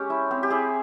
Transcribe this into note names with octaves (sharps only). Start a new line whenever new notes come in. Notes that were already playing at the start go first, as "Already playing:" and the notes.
Already playing: G#3 C#4 G4
E4
C4
G4
E4 G#4